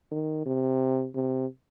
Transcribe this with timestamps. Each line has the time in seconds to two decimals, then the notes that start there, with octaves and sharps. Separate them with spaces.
0.11 D#3
0.46 C3
1.15 C3